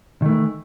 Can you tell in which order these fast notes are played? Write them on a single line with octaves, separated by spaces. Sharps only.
D#3 A3 E3